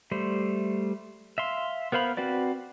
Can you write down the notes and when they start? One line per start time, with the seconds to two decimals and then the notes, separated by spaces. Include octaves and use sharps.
0.11 G3 A3 C5
1.38 E5 F5 C6
1.92 B3 A#4 C5 F5 B5
2.17 C4 F#4 B4 D5